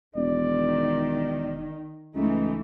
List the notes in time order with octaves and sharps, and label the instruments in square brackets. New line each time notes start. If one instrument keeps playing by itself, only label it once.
[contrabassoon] E1 [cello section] D#3 [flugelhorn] D5
[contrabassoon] C#2 [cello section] E3 A3 [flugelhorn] D#4